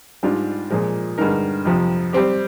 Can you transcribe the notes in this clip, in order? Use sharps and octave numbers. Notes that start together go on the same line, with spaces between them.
G#2 G3 D4 F4
A#2 F3 G#3
G2 D3 G#3 D#4 A#4
F2 C3 F3
G3 C4 G4